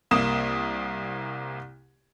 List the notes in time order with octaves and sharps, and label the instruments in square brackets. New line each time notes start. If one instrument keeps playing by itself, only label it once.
[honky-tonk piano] C2 A#3 D#6 E7